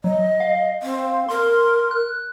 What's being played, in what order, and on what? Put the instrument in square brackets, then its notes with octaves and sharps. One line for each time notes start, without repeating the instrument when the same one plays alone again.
[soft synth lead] F#3 [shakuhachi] D#5
[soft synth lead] F5
[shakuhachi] C4
[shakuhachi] A#4 [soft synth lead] C6
[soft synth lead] F#6